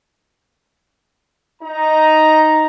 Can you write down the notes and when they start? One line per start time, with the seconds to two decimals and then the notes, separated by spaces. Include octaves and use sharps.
1.63 D#4 A#5